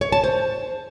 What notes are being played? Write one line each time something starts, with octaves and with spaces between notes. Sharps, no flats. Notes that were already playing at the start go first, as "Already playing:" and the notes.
C#5
A5
C5